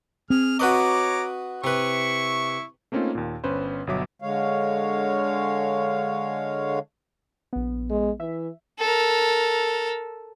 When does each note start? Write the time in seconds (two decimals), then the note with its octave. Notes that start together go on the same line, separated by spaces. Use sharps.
0.30 C4 G#4 F6
0.59 F#4 B4 C#5 D#5 A#5 D6
1.64 C3 E4 B4 C#6
2.92 A3 A#3 C4 C#4 D#4 F4
3.15 D#2 A#2
3.44 G1 C#4 B4 C5
3.87 G1 B2 F#3 E5 D6
4.22 D3 G#3 C#5 F5
7.53 A#1 B3
7.90 G#3
8.20 E3 E5
8.79 A4 A#4